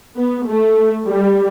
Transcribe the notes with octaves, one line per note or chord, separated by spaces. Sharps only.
B3
A3
G3